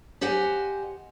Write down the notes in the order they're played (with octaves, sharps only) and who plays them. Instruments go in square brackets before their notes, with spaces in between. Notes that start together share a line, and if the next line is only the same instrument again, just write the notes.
[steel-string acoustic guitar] G4 C5 D#5 F#5 G#5